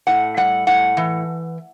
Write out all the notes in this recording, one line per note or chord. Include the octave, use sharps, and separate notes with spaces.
A2 F#5
G3 F#5
A2 F#5
E3